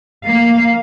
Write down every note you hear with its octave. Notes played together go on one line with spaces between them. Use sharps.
A#3 F5